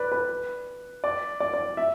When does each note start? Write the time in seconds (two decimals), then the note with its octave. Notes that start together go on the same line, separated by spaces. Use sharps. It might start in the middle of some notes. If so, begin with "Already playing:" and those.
Already playing: B4 D5
0.12 B4
1.04 D5
1.40 D5
1.54 D5
1.77 E5